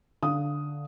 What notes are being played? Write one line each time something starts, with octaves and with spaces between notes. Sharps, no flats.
D3 F5 D#6